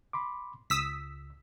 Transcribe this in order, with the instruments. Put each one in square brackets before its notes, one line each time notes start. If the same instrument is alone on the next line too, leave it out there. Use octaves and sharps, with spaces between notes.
[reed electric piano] B5 C6 D6
[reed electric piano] C#2 [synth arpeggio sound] D#6 E6 B6